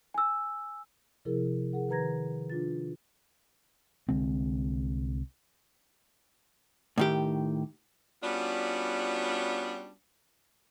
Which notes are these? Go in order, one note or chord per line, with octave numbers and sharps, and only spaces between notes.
G#5 E6
C3 F3 E4 G#4 A#4
G#4 A#4 F#5
D#3 B4 A#5 G#6 A#6
D4 F4 A6
C2 D3 G#3 C4
A2 D#3 G4
G3 B3 C#4 D4 F4 F#4